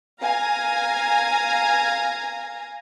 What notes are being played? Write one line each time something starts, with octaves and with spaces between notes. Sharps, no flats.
F5 G#5 A#5